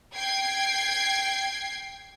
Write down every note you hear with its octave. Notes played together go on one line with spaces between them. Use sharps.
G5 G#6 C7